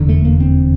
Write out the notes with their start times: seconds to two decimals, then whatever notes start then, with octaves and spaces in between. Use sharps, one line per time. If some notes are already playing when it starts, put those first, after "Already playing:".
Already playing: F1 E2 D3
0.09 A3
0.25 A#3
0.40 C4